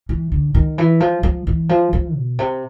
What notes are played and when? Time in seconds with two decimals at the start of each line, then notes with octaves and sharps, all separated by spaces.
0.09 E3
0.32 D3
0.54 D#3
0.78 E3
1.00 F3
1.23 F3
1.47 E3
1.69 F3
1.93 F3
2.16 B2
2.39 C3